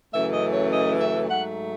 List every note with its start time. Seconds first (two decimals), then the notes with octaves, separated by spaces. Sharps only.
0.14 F#2 C#3 E3 A3 E5
0.33 D#5
0.52 C#5
0.71 D#5
1.00 E5
1.29 G#2 F#3 A3 F#5